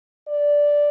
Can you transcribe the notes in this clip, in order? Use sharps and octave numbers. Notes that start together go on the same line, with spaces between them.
D5